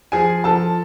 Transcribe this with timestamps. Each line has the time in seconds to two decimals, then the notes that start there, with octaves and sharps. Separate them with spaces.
0.12 F3 G#4 G#5
0.44 F3 A4 A5